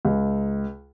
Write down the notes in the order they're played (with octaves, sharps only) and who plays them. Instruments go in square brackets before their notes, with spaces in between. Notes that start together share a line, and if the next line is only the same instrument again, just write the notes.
[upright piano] C#2